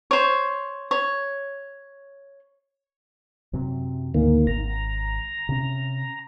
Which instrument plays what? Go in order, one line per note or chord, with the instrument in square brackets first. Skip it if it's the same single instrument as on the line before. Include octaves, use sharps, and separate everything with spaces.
[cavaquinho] C5 C#5
C#5
[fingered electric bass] F#2 C3 F#3
[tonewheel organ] D2 D#3 A#3 [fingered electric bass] G#2
[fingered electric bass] G#1 [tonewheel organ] A#5
[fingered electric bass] C3 C#4